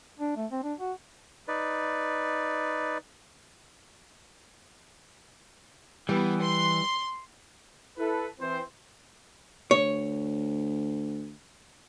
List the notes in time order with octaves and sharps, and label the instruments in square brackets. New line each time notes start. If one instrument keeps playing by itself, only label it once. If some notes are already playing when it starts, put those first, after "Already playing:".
[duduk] D4
A3
C4
D4
F#4
[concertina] D#4 B4 D5
[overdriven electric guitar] E3 [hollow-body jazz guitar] G3 [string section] B3
[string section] C6
[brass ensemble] E4 A4 B4
E3 C4 C5
[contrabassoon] D2 [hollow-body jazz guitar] C#5